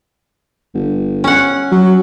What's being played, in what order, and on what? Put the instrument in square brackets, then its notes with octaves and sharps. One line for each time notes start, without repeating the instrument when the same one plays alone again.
[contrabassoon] G1
[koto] C#4 F#5
[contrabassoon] F#3